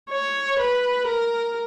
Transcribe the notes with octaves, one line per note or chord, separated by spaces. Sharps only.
C#5
B4
A#4